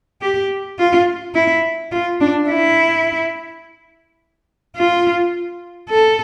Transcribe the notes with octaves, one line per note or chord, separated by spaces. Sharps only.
G4
F4
E4
F4
D4
E4
F4
A4